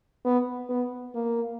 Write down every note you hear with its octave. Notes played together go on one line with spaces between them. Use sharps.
B3
B3
A#3